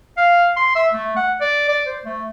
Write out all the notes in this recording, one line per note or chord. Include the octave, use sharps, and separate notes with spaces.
F5
C6
E5
A3
F#5
D5
D5
C5
A3